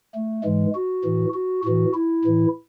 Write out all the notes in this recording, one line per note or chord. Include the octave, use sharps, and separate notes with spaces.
A3
G#2 E3 G#3
F#4
A2 E3
F#4
A2 E3 F#4
E4
A2 E3